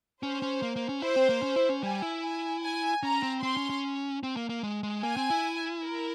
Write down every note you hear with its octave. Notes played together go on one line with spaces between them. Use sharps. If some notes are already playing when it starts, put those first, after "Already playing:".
C#4 C5
C#4
A#3
A#3
C#4
E4 C5
C4
A#3
C#4
E4
C#4
G3 G#5
E4
G#5
G#5
C#4 A#5
C4
C4 C6
C#4
C#4
C4
A#3
A#3
G#3
G#3
A#3 G#5
C4
E4
A#4